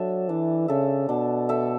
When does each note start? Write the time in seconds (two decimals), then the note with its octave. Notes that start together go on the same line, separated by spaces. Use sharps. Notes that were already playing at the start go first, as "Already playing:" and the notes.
Already playing: F#3 D4 A4 E5
0.29 E3 D4
0.68 C#3 A4 E5
1.09 B2 D4
1.49 A4 E5